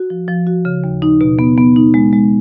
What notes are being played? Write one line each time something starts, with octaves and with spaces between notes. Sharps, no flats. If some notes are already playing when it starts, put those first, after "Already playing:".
Already playing: F#4
F3
F3
F#4
C#3
D#2
D#4
B2
B3
B3
D#4
G#3
G#3